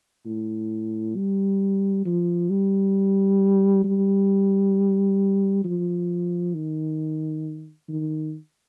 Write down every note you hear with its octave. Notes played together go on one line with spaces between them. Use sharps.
A2
G3
F3
G3
G3
F3
D#3
D#3